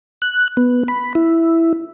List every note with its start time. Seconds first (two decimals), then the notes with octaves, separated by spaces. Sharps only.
0.22 F#6
0.57 B3
0.88 B5
1.15 E4